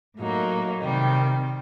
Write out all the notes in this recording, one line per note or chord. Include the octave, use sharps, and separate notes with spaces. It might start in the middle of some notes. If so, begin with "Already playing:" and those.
A2 F#3 A#3 D#4
C3 D#3 G3